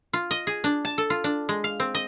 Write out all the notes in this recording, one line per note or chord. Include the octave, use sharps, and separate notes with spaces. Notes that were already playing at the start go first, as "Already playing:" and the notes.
F4
D#5
G#4
D4
A5
A4
F4
D4
G#3
F5
C4
D#5